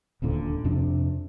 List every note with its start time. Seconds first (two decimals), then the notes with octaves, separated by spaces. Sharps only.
0.22 D#1 D2 A#2 D3
0.64 F2 C3 D4